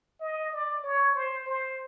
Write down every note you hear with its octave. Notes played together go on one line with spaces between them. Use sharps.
D#5
D5
C#5
C5
C5